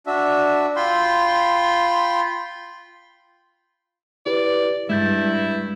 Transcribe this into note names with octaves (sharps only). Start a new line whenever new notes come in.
D4 F#4 E5
F4 G5 B5 C6
E4 G4 B4 D5
G2 G#3 E4 G6 A6